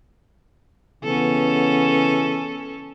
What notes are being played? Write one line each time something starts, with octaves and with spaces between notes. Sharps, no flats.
C#3 E3 B3 C#4 A4